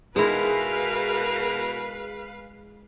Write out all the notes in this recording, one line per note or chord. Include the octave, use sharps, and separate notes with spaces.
B2 G#3 E4 G#4 A#4 B4 F5